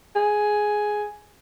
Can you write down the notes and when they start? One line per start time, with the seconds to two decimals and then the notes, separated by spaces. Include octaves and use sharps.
0.16 G#4